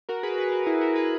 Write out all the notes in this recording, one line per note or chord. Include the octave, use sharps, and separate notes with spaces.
F#4 A#4
G#4 B4
G#4 B4
F#4 A#4
E4 G#4
F#4 A#4
G#4 B4